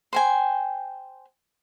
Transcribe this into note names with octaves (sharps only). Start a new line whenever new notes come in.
C5 G5 G#5